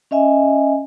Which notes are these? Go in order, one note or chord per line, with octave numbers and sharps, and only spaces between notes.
C#4 D#5 E5 G#5